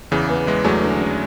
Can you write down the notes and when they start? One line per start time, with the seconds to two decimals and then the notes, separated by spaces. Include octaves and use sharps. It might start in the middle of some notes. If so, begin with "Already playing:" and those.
0.11 E2 C#3 E3
0.29 B3
0.47 E2 E3 G#3
0.64 E2 F#3 A3
0.83 D3
1.01 C#4